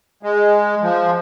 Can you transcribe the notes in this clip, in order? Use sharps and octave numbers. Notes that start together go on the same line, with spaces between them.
G#3
F3